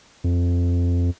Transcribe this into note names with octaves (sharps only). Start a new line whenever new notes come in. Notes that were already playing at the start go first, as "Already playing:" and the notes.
F2